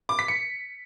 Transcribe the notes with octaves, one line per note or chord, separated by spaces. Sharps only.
D6
B6
C#7